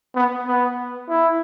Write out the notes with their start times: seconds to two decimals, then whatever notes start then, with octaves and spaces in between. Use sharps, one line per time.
0.15 B3
0.47 B3
1.09 E4